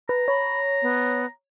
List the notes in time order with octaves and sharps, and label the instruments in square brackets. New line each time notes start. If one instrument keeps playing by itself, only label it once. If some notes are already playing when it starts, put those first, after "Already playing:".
[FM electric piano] B4 [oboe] A#5
[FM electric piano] C#5 [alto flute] B5
[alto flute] B3